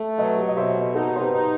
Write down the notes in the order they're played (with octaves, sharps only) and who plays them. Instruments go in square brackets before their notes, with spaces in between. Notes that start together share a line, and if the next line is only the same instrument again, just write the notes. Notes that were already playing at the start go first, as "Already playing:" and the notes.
Already playing: [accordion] A3
[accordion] F#3 [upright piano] B4 D#5
[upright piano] G4
D#5
[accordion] B2 [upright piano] C5 E5
[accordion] D#4 [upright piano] F#4 A4
[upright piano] C5
G4 B4
[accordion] D#4